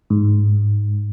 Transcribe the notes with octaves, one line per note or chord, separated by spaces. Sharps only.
G#2